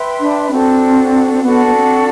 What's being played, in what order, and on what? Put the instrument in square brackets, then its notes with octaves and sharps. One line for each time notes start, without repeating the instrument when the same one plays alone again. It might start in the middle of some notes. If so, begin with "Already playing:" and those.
Already playing: [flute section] B4 E5 G5 C6
[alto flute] D4
[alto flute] C4 [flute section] D4 F#4 A4
[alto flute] C4
[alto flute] B3 [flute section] D4 F#4 A4
[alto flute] B3
C4